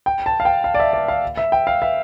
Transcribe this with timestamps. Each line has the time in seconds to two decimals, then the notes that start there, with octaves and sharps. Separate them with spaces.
0.06 G5
0.26 A5
0.40 F5
0.45 G5
0.64 F5
0.74 D5
0.80 E5
0.93 D5
1.08 F5
1.37 E5
1.52 G5
1.67 F5
1.82 E5